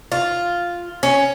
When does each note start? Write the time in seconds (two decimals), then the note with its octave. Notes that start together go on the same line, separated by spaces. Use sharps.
0.12 F4
1.03 C#4